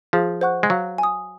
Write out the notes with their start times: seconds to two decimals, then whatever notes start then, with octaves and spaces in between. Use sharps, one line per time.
0.13 F3 G#4
0.41 C5 F#5 C#6 F#6
0.63 G#3
0.70 F#3 F5
0.98 G#5
1.03 D#6